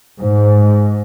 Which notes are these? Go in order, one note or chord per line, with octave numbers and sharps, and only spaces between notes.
G#2